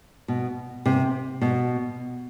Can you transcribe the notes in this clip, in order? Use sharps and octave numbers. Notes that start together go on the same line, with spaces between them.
B2
C3
B2